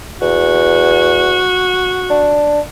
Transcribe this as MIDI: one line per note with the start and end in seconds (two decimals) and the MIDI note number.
0.21 1.44 40
0.21 2.38 66
2.10 2.60 62